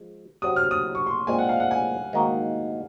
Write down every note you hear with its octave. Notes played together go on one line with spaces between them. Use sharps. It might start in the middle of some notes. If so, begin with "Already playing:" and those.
Already playing: F3 G#3
C3 F#3 C4 F#4 D#6
F6
D#6
C#6
C6
A#2 G#3 C4 G#5
F#5
F5
F#5
G#5
G#2 D#3 A#3 D#4 F#4